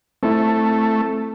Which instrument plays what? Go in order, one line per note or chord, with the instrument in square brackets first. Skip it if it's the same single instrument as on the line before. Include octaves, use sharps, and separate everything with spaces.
[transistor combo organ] A3 [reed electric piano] C4 E4